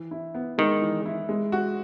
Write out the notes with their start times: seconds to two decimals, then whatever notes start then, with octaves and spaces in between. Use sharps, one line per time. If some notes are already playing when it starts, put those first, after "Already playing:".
Already playing: E3
0.11 E4
0.35 B3
0.58 D#3 G#3
0.82 E3
1.06 E4
1.29 G#3
1.52 F#4